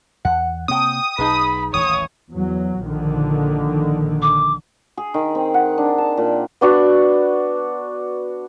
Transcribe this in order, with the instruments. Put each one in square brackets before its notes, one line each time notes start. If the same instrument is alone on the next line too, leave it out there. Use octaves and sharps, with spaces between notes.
[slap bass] E2 [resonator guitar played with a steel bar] F#5
[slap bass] C3 A#3 C4 [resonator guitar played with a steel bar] C#5 G5 [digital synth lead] D#6
[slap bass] B1 [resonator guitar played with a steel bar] D#4 G#4 B4 [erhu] B5
[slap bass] D#1 A1 E3 [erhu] C#5 [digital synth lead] D#6
[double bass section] E2 F#3
A#1 D3 D#3
[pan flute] D6
[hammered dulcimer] G#4
D#3
C4
F#5
D4
A5
A#2
[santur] B3 D4 F#4